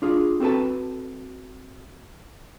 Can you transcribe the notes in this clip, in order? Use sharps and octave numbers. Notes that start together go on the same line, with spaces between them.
D4 F4 G#4
C4 F#4 A4 B4 A5